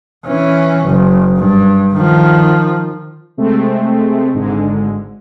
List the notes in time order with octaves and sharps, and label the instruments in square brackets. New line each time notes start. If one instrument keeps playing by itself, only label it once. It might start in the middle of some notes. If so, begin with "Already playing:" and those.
[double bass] E3 C#4
F#1
G2
D#3 F3
[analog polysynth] C3 G#3 A3 C4
G#1 G#2 D3 G#3